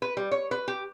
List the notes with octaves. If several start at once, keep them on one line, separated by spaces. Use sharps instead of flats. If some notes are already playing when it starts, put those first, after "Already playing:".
B4
G3
C#5
B4
G4